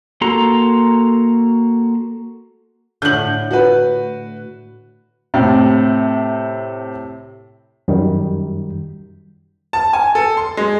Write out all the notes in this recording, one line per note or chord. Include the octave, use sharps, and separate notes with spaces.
A#3 F#4 A4 A#5 C6
A2 D3 G6 F#7
F#4 B4
A2 C3
F#2 D#3 G3
A5
G#5
A4
C6
G#3